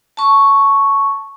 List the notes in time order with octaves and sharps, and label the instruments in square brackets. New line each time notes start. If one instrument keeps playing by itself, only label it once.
[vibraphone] A5 C#6